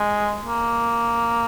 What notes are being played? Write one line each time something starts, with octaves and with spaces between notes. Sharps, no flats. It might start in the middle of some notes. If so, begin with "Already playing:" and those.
Already playing: G#3
A#3